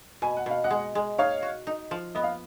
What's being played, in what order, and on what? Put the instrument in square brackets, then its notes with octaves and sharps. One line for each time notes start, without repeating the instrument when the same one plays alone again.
[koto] B2 [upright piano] G#5
[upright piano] F#5
[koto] B2 [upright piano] F5
[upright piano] D#5 F#5
[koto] G#3
G#3
[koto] D#4 [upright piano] C#5 F5
[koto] F#4
D#4
F3
[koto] B3 [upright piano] D#5
[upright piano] F5